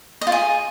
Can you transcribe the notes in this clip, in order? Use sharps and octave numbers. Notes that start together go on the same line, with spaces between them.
D#5
F4
G#4